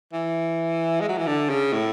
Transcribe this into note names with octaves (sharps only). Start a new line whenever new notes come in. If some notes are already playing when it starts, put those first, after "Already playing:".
E3
G#3
F#3
E3
D3
C#3
A2